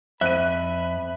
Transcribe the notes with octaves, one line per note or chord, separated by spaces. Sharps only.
F2 E5 B5 F#6 D#7